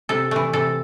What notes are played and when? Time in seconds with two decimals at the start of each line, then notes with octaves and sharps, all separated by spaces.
0.09 C3 A4
0.31 E3 A3
0.53 C3 A4